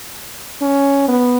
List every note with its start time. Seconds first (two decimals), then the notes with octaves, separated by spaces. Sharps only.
0.61 C#4
1.08 B3